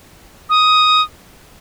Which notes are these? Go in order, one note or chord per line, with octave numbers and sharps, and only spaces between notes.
D#6